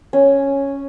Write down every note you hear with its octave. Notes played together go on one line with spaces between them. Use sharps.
C#4